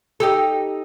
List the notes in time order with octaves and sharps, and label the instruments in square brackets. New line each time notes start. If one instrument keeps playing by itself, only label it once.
[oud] D#4 G4 A4